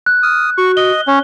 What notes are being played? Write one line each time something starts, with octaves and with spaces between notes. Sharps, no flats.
F#6
D#6 F6
F#4 C#6
D#5 G7
C#4 C#5